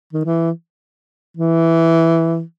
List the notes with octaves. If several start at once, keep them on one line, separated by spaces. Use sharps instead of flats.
D#3
E3
E3